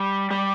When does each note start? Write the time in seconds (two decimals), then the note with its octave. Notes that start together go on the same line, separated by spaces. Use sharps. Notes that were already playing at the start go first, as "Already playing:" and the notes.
Already playing: G3
0.31 G3